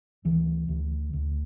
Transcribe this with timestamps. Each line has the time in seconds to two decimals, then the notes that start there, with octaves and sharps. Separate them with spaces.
0.25 D2 E3
0.68 D2
1.13 D2